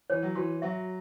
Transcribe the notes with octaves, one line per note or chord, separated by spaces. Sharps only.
E3 C#5
F#3
E3 F#4
F#3 E5